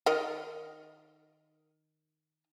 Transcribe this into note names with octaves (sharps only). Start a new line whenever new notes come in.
D#3 A#4 D#5